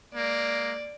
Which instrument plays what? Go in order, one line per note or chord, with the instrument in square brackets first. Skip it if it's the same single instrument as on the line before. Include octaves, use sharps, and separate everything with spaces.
[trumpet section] G#3 A#3 [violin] D5